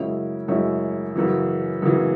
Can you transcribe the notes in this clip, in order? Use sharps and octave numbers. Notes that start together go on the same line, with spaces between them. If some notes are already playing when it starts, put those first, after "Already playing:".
Already playing: F#2 C#3 G#3 C#4 E4
F#2 C#3 G#3 C#4 E4
F#2 C#3 E3
F#2 C#3 E3